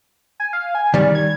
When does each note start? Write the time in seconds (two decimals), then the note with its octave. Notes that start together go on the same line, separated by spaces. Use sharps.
0.40 G#5
0.53 F5
0.75 G#5
0.94 D#3 G3 D5
1.15 G#6